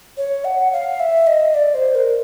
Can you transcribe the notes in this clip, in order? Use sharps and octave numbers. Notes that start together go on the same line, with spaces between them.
C#5
F#5
F5
E5
D#5
D5
C5
A#4